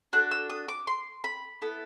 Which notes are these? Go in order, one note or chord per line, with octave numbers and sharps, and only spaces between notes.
D4 F#4 A4 F#6
E6
D#6
D6
C6
B5
B3 E4 A4